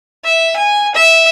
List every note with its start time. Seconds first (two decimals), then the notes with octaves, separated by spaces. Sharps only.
0.24 E5
0.56 G#5
0.95 E5